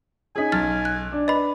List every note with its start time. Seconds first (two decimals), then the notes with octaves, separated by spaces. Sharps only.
0.36 C#4 D#4 G#4 G#5 B6
0.52 B1 A5 F6 A6
0.85 F#6
1.12 D4
1.28 B4 D#5 B5